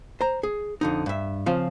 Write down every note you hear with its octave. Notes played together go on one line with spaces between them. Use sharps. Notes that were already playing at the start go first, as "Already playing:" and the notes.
C5 A#5
G#4
F2 D3 D#4
G2 E5
C#3 F3 C4 F4